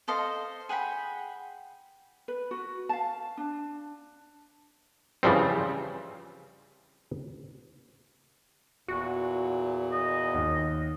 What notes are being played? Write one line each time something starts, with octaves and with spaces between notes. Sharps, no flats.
A4 C5 D#5 F5
G#4 F#5 G5 B5
B4
F#4
F5 A5
D4
C#3 E3 F3 G3 C4
E2 A#2 F#4
D#5
D#2